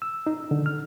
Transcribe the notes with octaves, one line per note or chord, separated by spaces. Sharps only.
E6
D#4
D3
F6